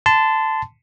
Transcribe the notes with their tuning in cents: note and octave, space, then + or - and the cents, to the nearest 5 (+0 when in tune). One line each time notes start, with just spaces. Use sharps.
A5 +0 C6 -30